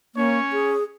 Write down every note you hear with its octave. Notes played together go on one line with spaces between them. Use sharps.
A#3 C#4 C#5
G#4